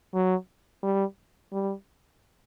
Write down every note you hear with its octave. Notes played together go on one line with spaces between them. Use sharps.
F#3
G3
G3